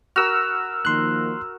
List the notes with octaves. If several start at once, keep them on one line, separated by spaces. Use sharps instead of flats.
F#4 A#4 B5 E6 F6
D#3 F3 A#3 C6 F#6